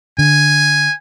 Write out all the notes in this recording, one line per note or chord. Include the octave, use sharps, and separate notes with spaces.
D3 G#5